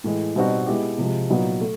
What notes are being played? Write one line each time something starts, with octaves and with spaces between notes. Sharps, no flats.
A2 E3 G#3
B2 G3 C4 D#4 F#4
G#3 B3 E4 G4
C3 F3 G#3
A#2 F#3 B3 D#4
A3